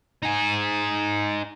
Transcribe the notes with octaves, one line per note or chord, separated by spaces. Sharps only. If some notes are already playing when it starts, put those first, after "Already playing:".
D#4 G#4